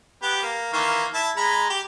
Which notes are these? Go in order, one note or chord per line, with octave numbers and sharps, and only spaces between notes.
B3 G4 B4
A#3
D#3 E3 A#3
E4 A5
G#3 A#5 B5
G4